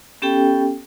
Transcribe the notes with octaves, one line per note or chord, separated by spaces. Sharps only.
B3 C#4 G4 A4 G5